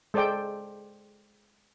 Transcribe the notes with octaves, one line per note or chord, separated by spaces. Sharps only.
G#3 A4 C5 D5 G5